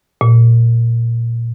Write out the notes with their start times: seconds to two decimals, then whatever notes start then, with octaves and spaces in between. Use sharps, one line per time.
0.21 A#2